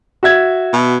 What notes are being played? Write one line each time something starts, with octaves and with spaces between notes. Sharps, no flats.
F#4 E5 G#6
B2